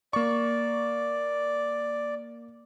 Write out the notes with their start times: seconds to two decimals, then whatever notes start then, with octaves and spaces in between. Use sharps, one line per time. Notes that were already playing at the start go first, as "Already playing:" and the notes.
0.13 A#3 D5 C#6